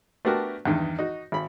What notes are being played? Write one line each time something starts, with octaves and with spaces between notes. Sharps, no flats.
A3 B3 D4 F#4 G4 A#4
E2 G2 D#3
D#4 F#4
G#1 B5